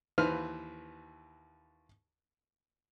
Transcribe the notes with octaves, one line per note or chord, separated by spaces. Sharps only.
D#2 E3 B4 C5 F6